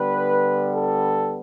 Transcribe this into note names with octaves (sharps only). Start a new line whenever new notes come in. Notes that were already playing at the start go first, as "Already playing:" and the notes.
Already playing: D3 G3 B3 B4
A4